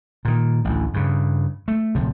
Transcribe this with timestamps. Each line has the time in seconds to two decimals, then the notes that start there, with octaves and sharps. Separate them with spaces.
0.25 A#2 D#3
0.65 A1 D2
0.94 G2 C#3
1.68 A3
1.95 D1 C3 F3